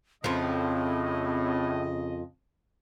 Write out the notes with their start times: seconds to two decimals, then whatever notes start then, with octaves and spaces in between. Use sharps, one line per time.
0.24 F2 A2 C#3 F3 C4 D#5